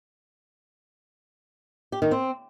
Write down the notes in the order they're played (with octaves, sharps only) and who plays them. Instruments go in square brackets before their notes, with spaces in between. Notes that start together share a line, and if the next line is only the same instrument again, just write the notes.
[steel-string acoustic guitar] G4
D#3
C4